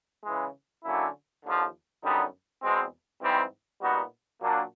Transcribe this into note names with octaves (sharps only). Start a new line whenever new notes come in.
C#3 E3 G#3
D3 F#3 A#3 C#4 E4
D#2 D3 F3
F#2 D3 G3 B3 D#4
E2 B2 G#3 C4
G#2 E3 G3 C4
A#2 G3 B3 D#4 F#4
A#2 F#3 A#3 D4